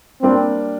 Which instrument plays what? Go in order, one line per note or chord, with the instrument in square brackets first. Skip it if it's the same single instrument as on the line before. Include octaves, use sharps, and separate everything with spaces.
[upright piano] G3 A#3 D4 [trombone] C4